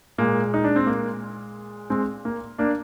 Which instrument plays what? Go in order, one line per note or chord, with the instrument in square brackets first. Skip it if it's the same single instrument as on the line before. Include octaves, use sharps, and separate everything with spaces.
[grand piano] A#2 G#3 A#3
D#4
D4
C4
A#3
G#3 C4
A#3
A#3 D4